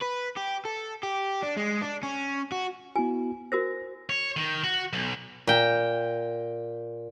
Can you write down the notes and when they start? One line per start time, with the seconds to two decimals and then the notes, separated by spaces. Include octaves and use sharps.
0.01 B4
0.37 G4
0.65 A4
1.03 G4
1.42 D4
1.57 G#3
1.81 D4
2.03 C#4
2.52 F#4
2.96 B3 E4 F#4 G#5
3.52 F#4 A#4 C5 A#6
4.10 C#5
4.37 D#3
4.64 F#4
4.93 B1
5.47 A#2 G5